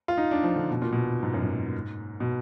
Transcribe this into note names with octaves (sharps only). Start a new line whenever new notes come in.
F4
D#4
D4
F3
D3
B2
A#2
B2
G#2
F#2
G#2
B2